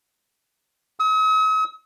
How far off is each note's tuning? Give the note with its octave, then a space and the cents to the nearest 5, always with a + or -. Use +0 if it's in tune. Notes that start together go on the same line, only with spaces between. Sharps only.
D#6 +45